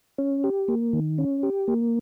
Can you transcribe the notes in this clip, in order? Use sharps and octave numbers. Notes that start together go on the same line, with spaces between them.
C#4
G4
A#3
D#3
C#4
G4
A#3